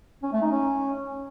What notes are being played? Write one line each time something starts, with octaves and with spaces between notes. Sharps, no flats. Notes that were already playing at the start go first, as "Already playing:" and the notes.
C#4
A3
D#4
C#4